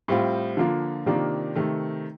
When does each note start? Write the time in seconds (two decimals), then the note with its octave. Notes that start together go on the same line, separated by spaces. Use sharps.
0.08 A2 G3 C4 F4
0.57 D3 F3 A#3 F4
1.06 C3 D#3 A#3 D4 F4
1.55 C3 D#3 A3